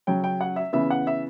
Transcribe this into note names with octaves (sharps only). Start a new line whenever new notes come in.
C#3 F#3 C#4 G5
G5
F#5
E5
C#3 E3 B3 E5
F#5
E5